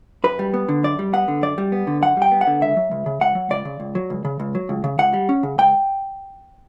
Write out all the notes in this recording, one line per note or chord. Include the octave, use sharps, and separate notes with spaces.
F#2 B4
G3
B3
D3
F#2 D5
G3
B3 F#5
D3
F#2 D5
G3
B3
D3
F#2 F#5
G3 G5
B3
F#5
D3
C#2 E5
F#3
C#2
C#3
C#2 F#5
F#3
C#2 D5
C#3
C#2
F#3
C#2
C#3
C#2
F#3
C#2
C#3
C#2 F#5
G3
C#4
C#3
C#2 G5